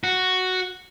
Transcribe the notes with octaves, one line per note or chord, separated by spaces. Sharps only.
F#4